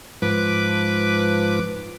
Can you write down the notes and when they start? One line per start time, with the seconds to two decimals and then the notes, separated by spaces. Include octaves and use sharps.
0.22 G#2 F3 B4 D6